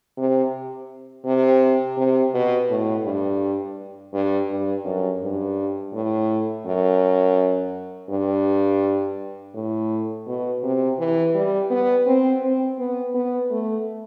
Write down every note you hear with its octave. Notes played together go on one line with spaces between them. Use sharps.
C3
C3
C3
B2
A2
G2
G2
G2
F#2
G2
A2
F#2
G2
A2
B2
C3
E3
G3
B3
C4
C4
B3
B3
A3